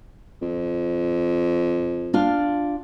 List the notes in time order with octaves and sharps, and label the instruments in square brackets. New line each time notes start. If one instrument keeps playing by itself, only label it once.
[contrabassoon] F2
[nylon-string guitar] D4 F4 F5